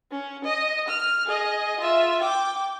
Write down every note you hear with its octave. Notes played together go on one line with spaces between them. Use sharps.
C#4
D#5
F6
G#4 D#5
F4 E5
G5 D6